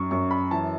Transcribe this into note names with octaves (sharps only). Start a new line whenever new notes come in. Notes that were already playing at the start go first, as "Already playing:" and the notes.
Already playing: F#2 C#6
F#2 C#6
B5
E3 A5